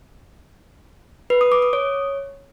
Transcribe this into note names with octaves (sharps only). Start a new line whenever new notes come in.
B4
D#6
D6
D#6
C#5